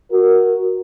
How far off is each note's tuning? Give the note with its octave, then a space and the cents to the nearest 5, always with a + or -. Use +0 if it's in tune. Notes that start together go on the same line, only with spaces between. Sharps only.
F#4 +0 A#4 +0